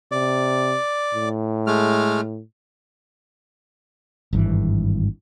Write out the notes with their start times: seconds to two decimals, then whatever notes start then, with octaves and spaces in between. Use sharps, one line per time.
0.11 C3 D5
1.14 A2
1.67 G#3 A3 F6
4.33 G#1 G2 E3